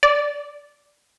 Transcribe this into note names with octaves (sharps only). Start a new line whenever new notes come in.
D5